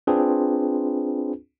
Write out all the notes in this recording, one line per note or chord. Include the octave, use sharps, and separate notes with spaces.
C4 D4 F4 G#4 B4